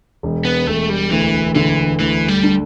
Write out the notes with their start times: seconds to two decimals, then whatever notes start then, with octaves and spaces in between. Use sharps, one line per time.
0.23 E1
0.45 B3
0.67 E1 A3
0.89 G3
1.11 D2 E3
1.55 D3 E3
1.99 D2 E3
2.28 G3
2.43 D4